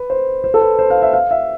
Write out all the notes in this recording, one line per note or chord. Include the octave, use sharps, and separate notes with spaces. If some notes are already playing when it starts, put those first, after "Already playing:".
Already playing: B4
C5
C5
A4
B4
C5
F5
E5
F5
E5